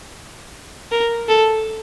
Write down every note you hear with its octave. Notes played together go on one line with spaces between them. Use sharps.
A#4
A4